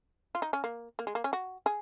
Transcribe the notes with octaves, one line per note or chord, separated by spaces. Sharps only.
F4
D#4
C#4
A#3
A#3
G#3
A#3
C#4
F#4
G#4